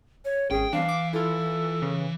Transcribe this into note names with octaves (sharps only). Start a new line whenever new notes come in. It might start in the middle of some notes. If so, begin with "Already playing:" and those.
C#5
G#1 C#4 G#4 G5
E3 G3 C4 D4 F5
D6
E4 F4 A4
C#3